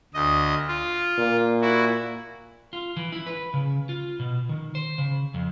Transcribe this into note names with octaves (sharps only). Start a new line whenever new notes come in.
D2 D#5
F4
A#2
E4 F#4
F4
E3
E4
B4
C#3
F4
B2
D#3
C5
C#3
F2